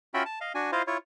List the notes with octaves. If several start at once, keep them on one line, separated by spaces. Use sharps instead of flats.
C#4 F4 F#4 E5 G5 B5
A5
D#5 F5
D4 F#4 G#5
E4 F4 C5 D#5 F5
E4 F4 C#5